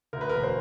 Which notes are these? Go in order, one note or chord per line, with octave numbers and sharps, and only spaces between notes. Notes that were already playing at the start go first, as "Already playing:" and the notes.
D2 A#4
B4
E1 A#4
C5